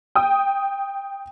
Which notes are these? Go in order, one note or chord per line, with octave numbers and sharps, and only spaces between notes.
G5 D#6